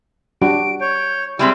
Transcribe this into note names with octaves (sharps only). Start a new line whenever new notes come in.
G3 D4 F#4 D7
C#5 G6
G3 G#3 C4 E4 G#4 B5